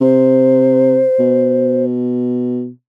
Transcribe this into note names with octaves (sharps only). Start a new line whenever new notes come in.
C3 C5
B2